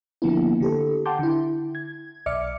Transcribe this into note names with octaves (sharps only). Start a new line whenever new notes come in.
D3 F3 A#3 B3 E4
D3 G4 A4
F#5 G5 A5 C6 D6 G6
D3 E4
G#6
B1 D5 E5 D6 F6 C#7